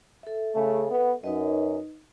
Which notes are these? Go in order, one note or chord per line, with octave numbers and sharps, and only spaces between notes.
A4 E5
C#3 A3
B3
F#2 D#4 B4 D#5